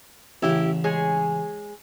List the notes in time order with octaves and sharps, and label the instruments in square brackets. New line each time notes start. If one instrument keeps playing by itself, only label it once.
[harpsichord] A1 C#3 [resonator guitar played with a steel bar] E4 G4
[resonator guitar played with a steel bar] G#3 G#4 C#5